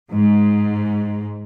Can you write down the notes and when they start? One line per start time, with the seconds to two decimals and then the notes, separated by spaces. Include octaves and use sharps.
0.12 G#2